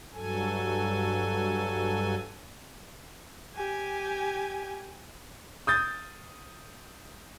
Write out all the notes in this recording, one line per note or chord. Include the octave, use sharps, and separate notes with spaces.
G2 F#3 A4 G#5
G4 G#5
D#6 G6 A6